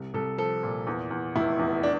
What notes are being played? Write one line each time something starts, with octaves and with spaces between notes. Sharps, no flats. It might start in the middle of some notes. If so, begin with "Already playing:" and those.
Already playing: C2
C2 A4
F3 A4
A#2
E2
E2
F1 E4
E2
D4